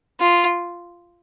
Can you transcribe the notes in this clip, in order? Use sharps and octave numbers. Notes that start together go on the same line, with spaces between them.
F4